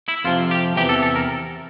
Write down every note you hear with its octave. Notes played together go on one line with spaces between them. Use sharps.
E4
F2 C3 F3 F4
F4
G4
E2 C3 E3 G4
A4
A4
A#4